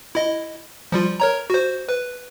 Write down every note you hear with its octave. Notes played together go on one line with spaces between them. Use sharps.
E4 D#5
F3 G3 F4
A#4 C#5 A#5
F#4 C5
B4